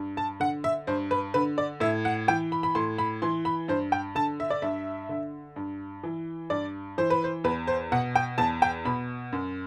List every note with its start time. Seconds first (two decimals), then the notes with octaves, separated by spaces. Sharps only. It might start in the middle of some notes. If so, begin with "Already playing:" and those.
Already playing: G2
0.17 A5
0.40 D3 F#5
0.64 E5
0.87 G2 C5
1.11 B4
1.34 D3 B4
1.58 D5
1.80 A2 E5
2.05 F#5
2.28 E3 G5
2.52 B5
2.63 B5
2.75 A2 C6
2.98 B5
3.22 E3 C6
3.45 B5
3.68 G2 C5
3.92 G5
4.15 D3 A5
4.40 E5
4.50 D5
4.62 G2 E5
5.09 D3
5.56 G2
6.03 E3
6.50 G2 D5
6.98 E3 C5
7.10 B4
7.24 C5
7.44 E2 B4
7.67 C5
7.92 B2 F#5
8.16 G5
8.38 E2 A5
8.62 G5
8.85 B2 B5
9.32 F#2